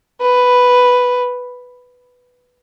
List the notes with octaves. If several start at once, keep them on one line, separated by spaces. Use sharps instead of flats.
B4